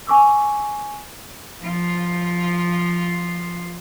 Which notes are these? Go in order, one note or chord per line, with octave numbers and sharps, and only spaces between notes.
G#5 C#6 D6 E6
F3 F4